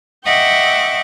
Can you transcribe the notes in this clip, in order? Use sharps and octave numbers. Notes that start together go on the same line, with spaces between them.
D#5 E5 F#5 G5 C#6 D6